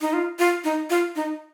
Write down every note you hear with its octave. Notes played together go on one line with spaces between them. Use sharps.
D#4
F4
F4
D#4
F4
D#4